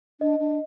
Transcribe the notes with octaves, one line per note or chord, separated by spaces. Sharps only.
D4 D#5
D4